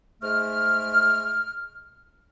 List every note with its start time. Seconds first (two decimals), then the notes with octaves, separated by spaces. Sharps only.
0.23 G#2 G#3 A3 F6